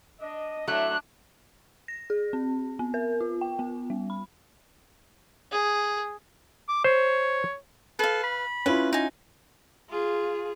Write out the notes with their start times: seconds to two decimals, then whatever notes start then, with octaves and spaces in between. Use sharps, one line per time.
0.21 D4 D#5
0.67 A2 F#3 A3 D4 E5 A#5 F#6
1.88 A#6
2.10 G#4
2.33 C4
2.79 B3
2.94 A#4
3.21 F4
3.41 G5
3.59 B3
3.90 G3
4.10 B5
5.52 G#4
6.69 D6
6.84 C5 C#5
7.99 A4 B4 F5
8.23 B5
8.66 C#4 E4 F4 B4
8.93 D#4 G#5
9.90 F4 G#4